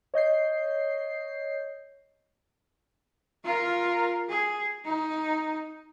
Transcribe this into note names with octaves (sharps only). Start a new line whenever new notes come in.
C#5 D#5 G6 C7
F4 A#4
G#4
D#4